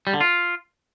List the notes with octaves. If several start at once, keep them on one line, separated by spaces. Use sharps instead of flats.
G3
D3
F4